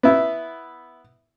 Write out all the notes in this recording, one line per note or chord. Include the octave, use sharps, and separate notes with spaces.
B3 E4